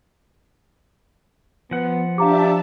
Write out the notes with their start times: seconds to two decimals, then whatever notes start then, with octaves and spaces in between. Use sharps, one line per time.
1.71 F3 B3 F#5
2.18 D4 G4 E5 F5 A5 A#5 D6